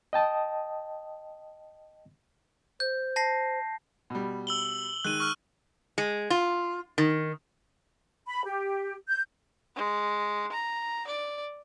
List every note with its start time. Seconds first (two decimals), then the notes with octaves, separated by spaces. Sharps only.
0.13 D#5 G5 A5 D#6
2.80 C5 G6
3.16 A5 A#6 C7
4.10 B2 G3
4.47 E6 F#7 G7
5.05 D#3 G#3 F#6 D#7
5.20 C#6 F6
5.98 G#3
6.30 F4
6.98 D#3
8.26 B5
8.45 G4
9.08 G6
9.76 G#3
10.52 A#5
11.07 D5